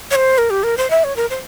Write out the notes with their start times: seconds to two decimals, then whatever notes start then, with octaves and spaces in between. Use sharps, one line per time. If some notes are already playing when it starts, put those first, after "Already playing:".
0.11 C#5
0.15 C5
0.38 A#4
0.50 G4
0.63 A#4
0.77 C5
0.90 E5
1.04 C#5
1.16 A#4
1.30 C5